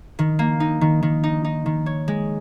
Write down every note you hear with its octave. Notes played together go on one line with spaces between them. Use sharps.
D#3
A#3
D#4
D#3
D#3
D#4
D#4
D#3
C#5
G#3